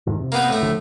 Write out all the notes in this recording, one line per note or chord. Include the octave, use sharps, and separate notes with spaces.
E2 G#2 D#3
C3
A#3 B3 D#4
A2 A3
D3 F3